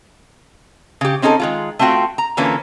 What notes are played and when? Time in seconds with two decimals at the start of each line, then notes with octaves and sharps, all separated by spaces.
1.01 C#3 G4
1.22 C4 C#4 D#4 G#4 A4
1.40 D#3 G#3 F4
1.79 A3 C4 F4 F#4 G5
2.18 A#5
2.37 D3 E3 A#3 C#4 F4 B4